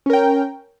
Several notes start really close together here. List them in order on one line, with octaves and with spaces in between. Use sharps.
C#4 A#4 G5